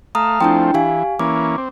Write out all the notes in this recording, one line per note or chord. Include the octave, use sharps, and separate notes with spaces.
A3 F5 A#5 D#6
F3 A3 C4 D4 E4 G5
E3 G4 F5 G#5
E3 A#3 C#4 D6
C4